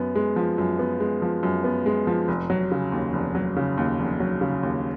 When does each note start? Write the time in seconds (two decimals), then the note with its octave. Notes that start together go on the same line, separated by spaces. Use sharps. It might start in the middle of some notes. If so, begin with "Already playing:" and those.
Already playing: F#2 B3
0.15 G#3
0.36 F3
0.58 F#2
0.79 B3
1.00 G#3
1.22 F3
1.43 F#2
1.64 B3
1.86 G#3
2.07 F3
2.28 F1
2.50 F#3
2.71 C#3
2.92 D#2
3.13 F1
3.35 F#3
3.56 C#3
3.77 D#2
3.99 F1
4.20 F#3
4.41 C#3
4.63 D#2